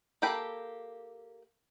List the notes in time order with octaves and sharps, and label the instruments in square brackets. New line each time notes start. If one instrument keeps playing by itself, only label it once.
[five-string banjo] A#3 G4 A4 G5 B5